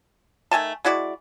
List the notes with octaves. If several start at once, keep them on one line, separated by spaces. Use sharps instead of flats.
D#3 A3 G#5 A5
G#3 E4 F#4 D5